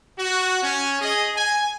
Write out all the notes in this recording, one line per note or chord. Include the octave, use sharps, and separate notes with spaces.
F#4
C#4
G#4 D#5
G#5